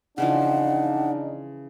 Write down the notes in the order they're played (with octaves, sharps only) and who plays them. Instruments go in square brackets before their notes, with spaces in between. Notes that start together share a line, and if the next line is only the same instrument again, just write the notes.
[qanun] C#3 E3 F3 [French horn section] D4 D#4 [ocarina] F#5